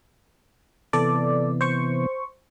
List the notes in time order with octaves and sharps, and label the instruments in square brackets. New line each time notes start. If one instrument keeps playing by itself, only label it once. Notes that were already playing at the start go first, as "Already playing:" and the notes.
[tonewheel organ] C3 E3 B3 [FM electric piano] A4 D5
[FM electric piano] C5 C#6